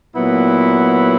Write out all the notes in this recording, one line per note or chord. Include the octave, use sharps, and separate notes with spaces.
A#2 F#3 B3 E4